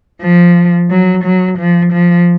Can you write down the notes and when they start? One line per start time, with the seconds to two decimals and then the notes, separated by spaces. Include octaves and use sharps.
0.22 F3
0.90 F#3
1.24 F#3
1.58 F3
1.93 F3